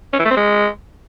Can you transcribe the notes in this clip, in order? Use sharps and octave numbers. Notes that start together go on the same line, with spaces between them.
C#4
E3
A3
C4
G#3